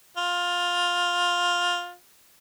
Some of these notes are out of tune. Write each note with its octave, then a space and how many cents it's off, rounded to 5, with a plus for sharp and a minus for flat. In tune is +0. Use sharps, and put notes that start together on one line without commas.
F4 +15